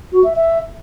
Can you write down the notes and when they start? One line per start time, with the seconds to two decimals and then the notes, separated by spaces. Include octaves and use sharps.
0.12 F#4
0.24 E5
0.36 E5